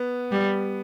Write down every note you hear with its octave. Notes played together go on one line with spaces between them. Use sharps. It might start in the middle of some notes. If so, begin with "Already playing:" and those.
Already playing: B3
G3